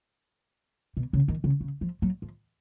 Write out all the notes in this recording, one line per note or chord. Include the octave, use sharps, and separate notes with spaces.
B2
C#3
D#3
C#3
C#3
F3
F#3
F3